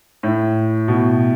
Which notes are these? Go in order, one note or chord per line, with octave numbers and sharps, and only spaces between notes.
A2
B2